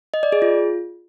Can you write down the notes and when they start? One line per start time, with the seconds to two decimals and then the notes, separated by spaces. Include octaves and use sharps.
0.14 D#5
0.23 D5
0.32 G#4
0.42 F4